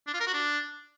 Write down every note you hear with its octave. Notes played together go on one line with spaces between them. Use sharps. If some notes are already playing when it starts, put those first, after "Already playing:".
D4
F4
A#4
F#4
D4